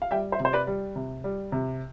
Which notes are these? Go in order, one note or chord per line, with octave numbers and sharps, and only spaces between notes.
F5
G3 E5 G5
C5 E5
C3
C5
B4 D5
G3
C3
G3
C3